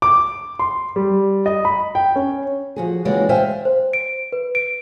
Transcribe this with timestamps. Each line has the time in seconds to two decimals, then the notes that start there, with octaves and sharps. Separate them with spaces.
0.02 D6
0.59 C6
0.96 G3
1.46 D#5
1.65 B5
1.95 G5
2.16 C#4
2.76 F3 F#4 G#4
3.05 D#2 C#3 E3 G#3 F#4 D5
3.29 C5 E5 F5 G5 G#5
3.65 C5
3.93 D7
4.32 B4
4.55 D7